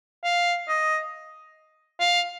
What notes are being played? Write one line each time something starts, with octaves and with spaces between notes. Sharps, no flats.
F5
D#5
F5